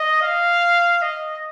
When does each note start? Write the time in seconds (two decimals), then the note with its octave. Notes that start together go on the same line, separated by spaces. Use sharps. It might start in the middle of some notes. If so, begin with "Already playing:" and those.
Already playing: D#5
0.22 F5
1.02 D#5